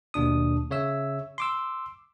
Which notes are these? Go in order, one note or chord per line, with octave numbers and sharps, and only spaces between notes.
D#2 B2 D4 D#6
C#3 C#5 E5 E6
C6 D6 E6